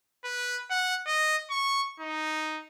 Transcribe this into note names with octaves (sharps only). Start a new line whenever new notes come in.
B4
F#5
D#5
C#6
D#4